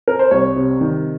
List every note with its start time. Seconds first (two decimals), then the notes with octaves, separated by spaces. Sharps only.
0.08 A#4
0.19 C5
0.31 C2 C#5
0.56 C3
0.81 D#3